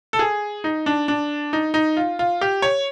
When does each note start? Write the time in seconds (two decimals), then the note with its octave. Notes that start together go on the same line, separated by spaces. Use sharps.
0.13 A4
0.19 G#4
0.64 D#4
0.86 D4
1.08 D4
1.53 D#4
1.74 D#4
1.97 F4
2.19 F4
2.41 G4
2.62 C#5